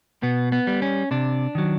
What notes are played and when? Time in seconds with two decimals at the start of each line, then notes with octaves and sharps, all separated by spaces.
0.23 B2 B3
0.52 B3
0.67 G3
0.82 C#4
1.11 C3 D4
1.55 D#3 F#3